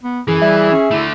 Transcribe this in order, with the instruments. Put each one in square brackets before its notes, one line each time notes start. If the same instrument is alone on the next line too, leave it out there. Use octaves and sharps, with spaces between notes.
[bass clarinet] B3
[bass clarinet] F#2 [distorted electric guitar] E3 [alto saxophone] G#4
[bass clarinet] G3 [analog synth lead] E5
[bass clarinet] C#4
[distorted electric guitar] D3 A3 [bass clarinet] E4